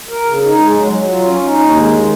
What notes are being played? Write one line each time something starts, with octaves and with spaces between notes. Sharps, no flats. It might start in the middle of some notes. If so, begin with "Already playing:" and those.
A#4
C#3
D#4
G#3
F#3
F#3
F4
C#4
D#4
D#2
G#3
D#3